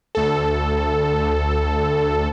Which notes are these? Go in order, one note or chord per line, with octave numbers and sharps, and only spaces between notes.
D2 A4